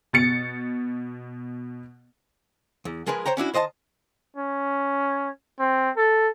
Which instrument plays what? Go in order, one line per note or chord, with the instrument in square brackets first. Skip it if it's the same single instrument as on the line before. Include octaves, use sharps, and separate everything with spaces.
[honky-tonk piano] B2 A6 C#7
[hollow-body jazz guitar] E2
F3 G#3 G#4 A#4 B4
C5 C#5 G5 A#5
C#4 D4 E4 F#4
D#3 C5 D#5 F#5 A5
[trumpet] C#4
C4
A4